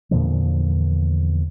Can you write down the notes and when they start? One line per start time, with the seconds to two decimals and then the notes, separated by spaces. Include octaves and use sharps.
0.11 E2 A#2 D3 F3